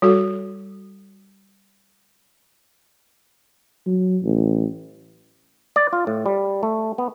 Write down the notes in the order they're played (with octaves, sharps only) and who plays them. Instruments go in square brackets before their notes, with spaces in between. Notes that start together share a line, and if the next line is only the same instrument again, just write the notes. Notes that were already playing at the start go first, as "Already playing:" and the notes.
[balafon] G3 F#4 A4
[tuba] F#3
A1
[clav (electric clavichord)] D5
F4
A2
G3
A3
B3